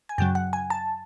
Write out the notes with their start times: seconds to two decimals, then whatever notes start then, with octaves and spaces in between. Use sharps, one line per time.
0.09 G#5
0.18 F#2 C#3 F#3 G5
0.35 F#5
0.53 G#5
0.70 A5